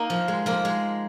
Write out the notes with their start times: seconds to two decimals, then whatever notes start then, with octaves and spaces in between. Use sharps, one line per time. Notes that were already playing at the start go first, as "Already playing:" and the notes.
Already playing: A#3 D#4
0.10 F3
0.28 G#3
0.46 F3 A#3
0.65 G#3